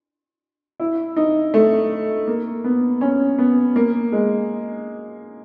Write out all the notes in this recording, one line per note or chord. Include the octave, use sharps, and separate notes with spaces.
E4
D#4
A3
A#3
B3
C#4
B3
A#3
G#3